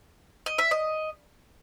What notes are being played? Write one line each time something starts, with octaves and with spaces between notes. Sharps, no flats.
D#5
E5
D#5